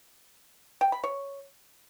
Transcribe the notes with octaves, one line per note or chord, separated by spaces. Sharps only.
G5
B5
C#5